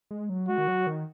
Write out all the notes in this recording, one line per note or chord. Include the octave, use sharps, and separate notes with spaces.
G#3
F#3
G#3 F#4
D#3
F#3
D#3